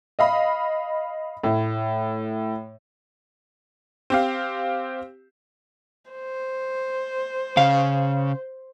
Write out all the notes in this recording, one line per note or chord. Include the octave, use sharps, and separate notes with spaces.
D#5 F5 B5
A2
C4 G4 F5
C5
C#3 F5